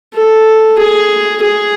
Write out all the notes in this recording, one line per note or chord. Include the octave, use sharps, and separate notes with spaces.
A4
G#4
G#4